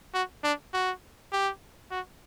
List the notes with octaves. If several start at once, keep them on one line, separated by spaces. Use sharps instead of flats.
F#4
D4
F#4
G4
F#4